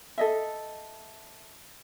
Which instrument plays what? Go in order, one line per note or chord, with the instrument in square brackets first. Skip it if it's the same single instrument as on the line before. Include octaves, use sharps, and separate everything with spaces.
[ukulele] A4 D#5 E5